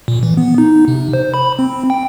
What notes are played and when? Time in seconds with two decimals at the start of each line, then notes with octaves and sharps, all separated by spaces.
0.08 A#2
0.23 E3
0.37 B3
0.58 D#4
0.88 C3
1.13 C5
1.34 B5
1.59 C4
1.90 G5